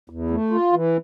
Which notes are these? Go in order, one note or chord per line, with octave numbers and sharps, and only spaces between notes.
E2
A3
F4
E3